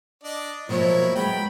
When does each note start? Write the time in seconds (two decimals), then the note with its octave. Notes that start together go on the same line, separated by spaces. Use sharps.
0.24 D4 D5 D#5
0.69 B2 F3 F#3 A#3 E4 C#5
1.15 F#3 G#3 B3 G5 B5